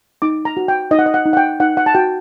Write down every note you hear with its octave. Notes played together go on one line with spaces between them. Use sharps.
D#4 D6
A#5
F#4
G5
D#4 D#5
F#5
D#5
F#5
D#4
F#5
G5
D#4 F#5
F#5
A5
F#4 G5